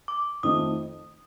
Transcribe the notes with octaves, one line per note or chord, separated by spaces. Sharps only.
D6
F2 D#3 A3 D#6